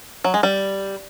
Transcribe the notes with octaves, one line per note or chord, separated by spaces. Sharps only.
F#3
G#3
G3